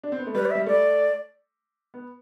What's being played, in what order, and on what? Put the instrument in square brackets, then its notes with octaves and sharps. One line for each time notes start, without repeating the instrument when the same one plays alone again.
[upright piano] D4
C4
B3
A3
[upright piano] G3 [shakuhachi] B4
[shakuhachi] D5
[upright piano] G3 [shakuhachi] E5
[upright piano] A3 [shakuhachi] D5
[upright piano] B3